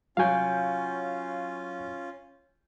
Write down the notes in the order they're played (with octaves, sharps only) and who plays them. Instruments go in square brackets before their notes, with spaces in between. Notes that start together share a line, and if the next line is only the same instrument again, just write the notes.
[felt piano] F#3 F#4 G6 [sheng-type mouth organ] C#4 F4 [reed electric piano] F5 G#5